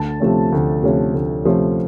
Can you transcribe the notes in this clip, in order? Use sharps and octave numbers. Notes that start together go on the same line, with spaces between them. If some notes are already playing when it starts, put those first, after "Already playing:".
Already playing: D2 A5
C3 F3 A3 C#4
D2
C3 F3 A3 C#4
D2
C3 F3 A3 C#4